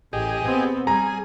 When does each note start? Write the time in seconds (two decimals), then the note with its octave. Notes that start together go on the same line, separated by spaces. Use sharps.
0.13 A1 G4 G#4 D#5
0.44 B3 C4
0.87 G3 G#4 A#5